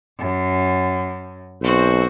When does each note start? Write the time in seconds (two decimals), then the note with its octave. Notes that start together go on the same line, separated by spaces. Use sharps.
0.17 F#2
1.61 B1 C4 F#4 C5